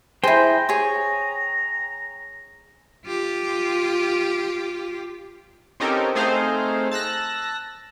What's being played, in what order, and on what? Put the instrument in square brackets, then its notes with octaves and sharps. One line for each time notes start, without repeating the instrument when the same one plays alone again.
[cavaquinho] E4 G#4 [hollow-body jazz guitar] C5 [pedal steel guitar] G5 [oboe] A#5
[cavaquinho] G#4 C#5
[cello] F4 G4
[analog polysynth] C4 C#4 D#4 G4 A4 A#4
A3 C4 D#4 G#4 C5 F5
A5 E6 F#6 A#6